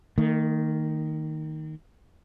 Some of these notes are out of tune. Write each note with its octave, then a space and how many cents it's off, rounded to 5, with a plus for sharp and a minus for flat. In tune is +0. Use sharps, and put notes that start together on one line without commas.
D#3 +0 A#3 -45